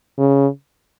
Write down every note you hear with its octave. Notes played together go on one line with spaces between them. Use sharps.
C#3